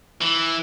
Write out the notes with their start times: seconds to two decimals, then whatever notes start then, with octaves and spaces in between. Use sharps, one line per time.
0.21 E3